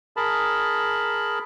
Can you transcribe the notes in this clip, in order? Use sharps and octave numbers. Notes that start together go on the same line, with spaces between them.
G#4 A#4 A5 B5